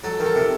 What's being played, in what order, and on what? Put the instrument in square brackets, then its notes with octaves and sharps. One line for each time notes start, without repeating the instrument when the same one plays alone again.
[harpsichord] F#3 [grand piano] A4
[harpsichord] D#3
[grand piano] A4
[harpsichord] C3